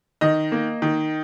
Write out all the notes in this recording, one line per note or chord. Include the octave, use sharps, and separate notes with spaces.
D#3 D#5
A#3
D#3